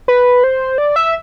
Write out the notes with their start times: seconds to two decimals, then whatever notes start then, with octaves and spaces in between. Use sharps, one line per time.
0.08 B4
0.44 C5
0.78 D5
0.96 E5